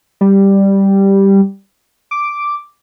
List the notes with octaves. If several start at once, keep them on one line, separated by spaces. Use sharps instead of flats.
G3
D6